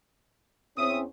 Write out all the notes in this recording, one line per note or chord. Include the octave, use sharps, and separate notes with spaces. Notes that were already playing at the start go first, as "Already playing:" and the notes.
E2 C4 C#4 E5 D#6